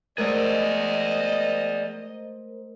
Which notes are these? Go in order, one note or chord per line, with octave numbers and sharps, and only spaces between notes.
G#3 A3 G#4 A#4 C5 D5 D#5